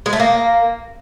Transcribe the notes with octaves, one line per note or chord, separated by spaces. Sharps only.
G#3
A3
A#3